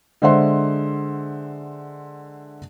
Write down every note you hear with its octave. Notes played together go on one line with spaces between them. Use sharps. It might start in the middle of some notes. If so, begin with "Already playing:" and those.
D3 G#3 C5 E5 F#5 C6